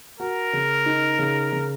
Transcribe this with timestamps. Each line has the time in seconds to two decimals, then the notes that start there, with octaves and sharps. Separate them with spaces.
0.20 F#4 A#4
0.53 C#3
0.86 D#4
1.19 C#3
1.52 C#3